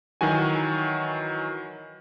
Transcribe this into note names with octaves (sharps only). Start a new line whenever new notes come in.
D#3 E3 F#3 F#4 G#5